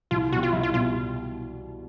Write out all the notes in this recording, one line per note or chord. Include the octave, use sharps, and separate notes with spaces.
C2 F4
B2 G3 F#4
F4
C2 E4
F4
B2 G3 F4